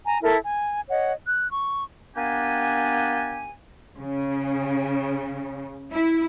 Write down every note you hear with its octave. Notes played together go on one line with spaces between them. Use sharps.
G#5 A#5
E4 A4 A#4
G#5
C#5 D#5 F#5
F#6
C#6
A#3 B3 D4 G4 G#5
C#3
E4